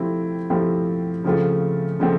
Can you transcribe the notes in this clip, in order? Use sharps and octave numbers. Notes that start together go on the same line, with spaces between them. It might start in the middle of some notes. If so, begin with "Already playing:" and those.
Already playing: F3 A3 C4 E4 G4
F3 A3 C4 E4 G4
C#3 F3 A3 C4 F4
C#3 F3 A3 C4